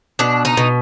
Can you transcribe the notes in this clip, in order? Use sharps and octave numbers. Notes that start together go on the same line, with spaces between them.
B2 D4
D#4
B2